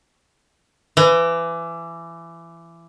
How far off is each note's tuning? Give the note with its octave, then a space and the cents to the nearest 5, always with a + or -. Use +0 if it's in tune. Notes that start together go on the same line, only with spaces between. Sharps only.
E3 +25